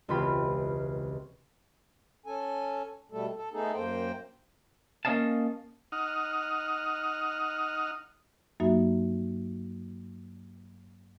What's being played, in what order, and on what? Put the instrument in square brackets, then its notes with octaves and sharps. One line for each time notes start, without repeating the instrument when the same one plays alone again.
[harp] E1 C#2 C4 F4 G4 B5
[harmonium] C#4 A4 G#5
B2 G3 A3 A4
A4
A3 B3 D#4 G#4 A4
F#2 A#3 C5 G5
[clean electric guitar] A#3 C4 C#4 D#5 F5 A5
[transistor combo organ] D#4 F#5 D#6 F6
[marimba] G2 F#3 A#3 D#4 F#4 E5